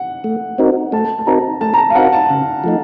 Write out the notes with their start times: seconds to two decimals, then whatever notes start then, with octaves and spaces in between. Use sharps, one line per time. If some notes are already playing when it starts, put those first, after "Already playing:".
Already playing: F#5
0.24 A3
0.58 C4 D#4 F#4 A#4
0.92 A3 A5
1.19 A5
1.27 C4 D#4 F#4 A#4 A#5
1.61 A3 A5
1.74 A#5
1.78 A5
1.90 F5
1.95 C4 D#4 F#4 A#4 F#5
2.12 A5
2.30 C#3
2.64 F3 A3 D#4